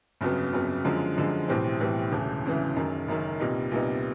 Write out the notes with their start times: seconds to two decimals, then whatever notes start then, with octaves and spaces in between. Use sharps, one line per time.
0.21 G1 F2 C#3 F#3 B3
0.53 G1 F2 C#3 F#3 B3
0.84 F#2 D3 F3 G#3
1.16 F#2 D3 F3 G#3
1.48 B1 A2 E3 G3 C4
1.80 B1 A2 E3 G3 C4
2.12 E1 D2 C#3 E3
2.44 E1 D2 C#3 E3
2.76 F#1 F#2 D#3
3.08 F#1 F#2 D#3
3.40 C2 A#2 G3 B3 D#4
3.71 C2 A#2 G3 B3 D#4